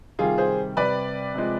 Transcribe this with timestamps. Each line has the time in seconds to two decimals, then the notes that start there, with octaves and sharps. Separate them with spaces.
0.19 C3 D#3 G3 F4 G#4
0.38 G#4 C5
0.76 C3 G3 B4 D5
1.34 C3 F3 G#3